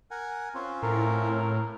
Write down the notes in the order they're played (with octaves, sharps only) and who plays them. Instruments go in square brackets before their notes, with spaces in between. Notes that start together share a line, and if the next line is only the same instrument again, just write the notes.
[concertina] A#4 F#5 G#5
C4 C#4 F4
[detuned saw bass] A2 [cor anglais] A#4